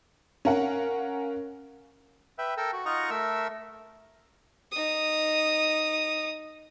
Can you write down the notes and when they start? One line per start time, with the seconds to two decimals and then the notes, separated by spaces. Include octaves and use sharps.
0.45 C#4 A#4 F5 F#5
2.39 B4 E5 G5
2.58 A4 A#4 G5 E6
2.73 F#4
2.86 D#4 F4 D#5 F#5 A#5 C#6
3.10 A3 A#4 E5 E6
4.72 D#4 D#6